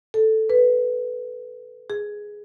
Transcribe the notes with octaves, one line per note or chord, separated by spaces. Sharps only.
A4
B4
G#4